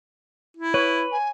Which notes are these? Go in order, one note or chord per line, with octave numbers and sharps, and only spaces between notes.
E4
B4 C#5
G#5